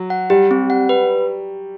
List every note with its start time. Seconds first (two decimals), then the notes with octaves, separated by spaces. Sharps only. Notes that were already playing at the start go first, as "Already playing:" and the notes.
Already playing: F#3
0.10 F#5
0.30 G3 G4
0.51 C4
0.70 F#5
0.89 B4